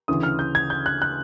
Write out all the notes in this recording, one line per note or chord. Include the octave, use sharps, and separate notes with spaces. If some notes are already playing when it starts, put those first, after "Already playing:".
D2 C#3 E3 D#6
F6
G6
G#6
G6
F#6
F#6